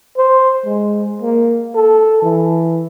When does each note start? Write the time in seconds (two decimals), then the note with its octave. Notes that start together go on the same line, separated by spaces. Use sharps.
0.17 C5
0.66 G#3
1.22 A#3
1.75 A4
2.22 E3